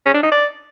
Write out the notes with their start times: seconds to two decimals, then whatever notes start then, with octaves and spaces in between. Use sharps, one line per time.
0.06 C#4
0.14 D4
0.23 D#4
0.32 D5